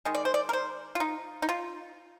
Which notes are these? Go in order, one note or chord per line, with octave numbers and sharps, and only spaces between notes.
D#3 G#3
D5
C5
D5
A#4
C5
F4
D#4
D#4
F4